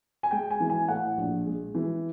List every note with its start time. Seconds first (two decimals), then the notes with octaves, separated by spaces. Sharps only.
0.23 G#5
0.31 G#3 G5
0.50 G#5
0.60 E3
0.70 G#5
0.88 A2 F#5
1.17 A#1
1.46 G#3
1.75 E3